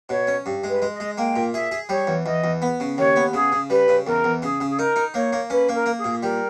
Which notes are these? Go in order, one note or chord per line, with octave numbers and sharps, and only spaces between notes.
B2 C#5
C#4
G2
G#3
B4
G#3
D#5
G#3
A#3 G5
A#2
G#4 E5
G#4
G3 C#5
E2
E2 D#5
E2
B3
C#3
D#2 C#5
B3
C#3 G#4
C#3
G3 B4
C#3
E2 A#4
E2
C#3 G#4
C#3
G#4
D#4 A#4
D#4
A#3 C#5
A#3
C#4 B4
A#3
A#4
A#3
G#4
A#2
G3 A#4